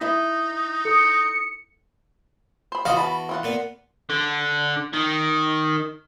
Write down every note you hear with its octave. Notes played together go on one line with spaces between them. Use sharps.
D#4 E4 B4 D#5
A4 D#6 C#7
C5 B5
E2 F4 F#4 D#5 F5 D6
B4 A5 B5
E3 F4 F#5
A#2 B3
D3
D#3